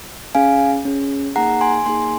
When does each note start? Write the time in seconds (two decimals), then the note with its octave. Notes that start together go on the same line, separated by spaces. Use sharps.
0.35 C#4 G#4 F5 G#5
0.85 C#4 G#4
1.36 A#3 D#4 G#4 F#5 A#5
1.61 G#5 C6
1.86 A#3 D#4 G#4 G#5 C6